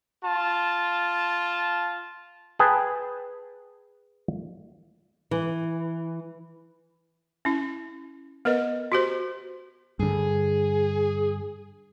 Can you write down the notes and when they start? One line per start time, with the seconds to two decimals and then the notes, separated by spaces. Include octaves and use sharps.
0.24 F4 A5
2.59 G#4 B4 G5 A5
5.31 E3
7.45 C#4 E4
8.45 B3 A#4 B4 D#5
8.92 F#4 G4 C5
9.99 G2 D3 G#4